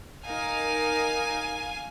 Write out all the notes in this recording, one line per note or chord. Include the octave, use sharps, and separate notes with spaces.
D#4 A#4 F5 G#5